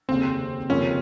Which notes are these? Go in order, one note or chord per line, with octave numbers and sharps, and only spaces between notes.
F1 D#2 C#3 C4
F1 D#2 C#3 F3 A#3 C#4